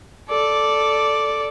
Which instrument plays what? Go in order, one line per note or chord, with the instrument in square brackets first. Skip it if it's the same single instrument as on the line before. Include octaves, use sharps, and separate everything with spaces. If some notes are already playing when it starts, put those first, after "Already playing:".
[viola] A4 D5